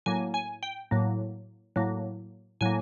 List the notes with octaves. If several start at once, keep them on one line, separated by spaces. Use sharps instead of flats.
A2 F#3 A#3 G#5
G#5
G5
A2 F#3 A#3
A2 F#3 A#3
A2 F#3 A#3 G#5